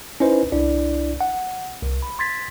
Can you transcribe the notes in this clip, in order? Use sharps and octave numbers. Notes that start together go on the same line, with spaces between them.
C#4 D#4 E4 B4 C5 D#5
C2 D4 E4 D5
F#5
C2
B5
C6 G#6 A6 B6